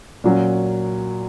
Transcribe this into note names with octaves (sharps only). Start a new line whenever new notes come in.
A#2 F#3 C#4